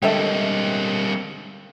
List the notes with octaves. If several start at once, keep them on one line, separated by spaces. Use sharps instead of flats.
D3 G3 G#3 A#3 C4 A4 E5 G5